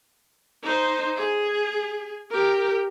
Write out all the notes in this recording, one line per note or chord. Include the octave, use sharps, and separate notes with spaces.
D#4 C5
G#4
G4 A#4